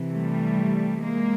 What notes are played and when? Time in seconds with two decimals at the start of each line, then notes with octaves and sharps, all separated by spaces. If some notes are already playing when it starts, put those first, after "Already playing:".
Already playing: C3 E3
0.12 G3 A3
1.04 G#3 A#3